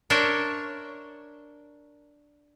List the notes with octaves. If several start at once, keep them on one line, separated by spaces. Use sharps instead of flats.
D4 A#4 C5 C#5 E5